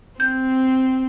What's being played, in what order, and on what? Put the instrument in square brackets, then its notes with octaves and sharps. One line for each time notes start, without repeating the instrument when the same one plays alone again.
[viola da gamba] C4 [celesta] G6